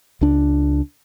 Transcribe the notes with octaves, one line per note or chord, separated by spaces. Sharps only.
C#2 D4